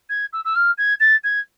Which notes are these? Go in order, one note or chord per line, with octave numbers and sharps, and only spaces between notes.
G#6
E6
E6
F6
G#6
A6
G#6